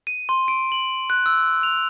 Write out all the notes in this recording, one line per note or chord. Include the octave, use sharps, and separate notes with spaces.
D#7
C6
D7
F#7
F#6
E6
F7